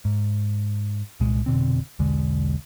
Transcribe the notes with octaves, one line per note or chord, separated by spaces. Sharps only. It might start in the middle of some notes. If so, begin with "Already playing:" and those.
G#2
C2 A#2 G#3
F1 B2 D3 C4
B1 E2 D3 G#3